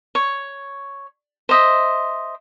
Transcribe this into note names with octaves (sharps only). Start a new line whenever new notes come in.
C#5
C5 D#5 E5